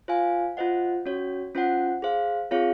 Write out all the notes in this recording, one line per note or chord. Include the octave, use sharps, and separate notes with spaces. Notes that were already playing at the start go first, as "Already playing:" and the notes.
F4 C5 F5 G#5
F4 C5 D#5 F#5
C#4 F#4 C#5
C#4 F4 C5 F#5
G#4 C5 F5
C4 F4 G#4 C#5 F5